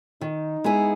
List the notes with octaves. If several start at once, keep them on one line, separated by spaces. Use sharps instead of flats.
D#3 D#4
G#3 B3 E4 G#4